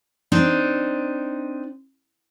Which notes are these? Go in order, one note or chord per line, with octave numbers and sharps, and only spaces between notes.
C4 D4 D#4